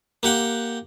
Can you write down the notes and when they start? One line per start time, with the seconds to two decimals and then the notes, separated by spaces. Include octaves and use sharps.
0.23 A#3 G4 F#5 G5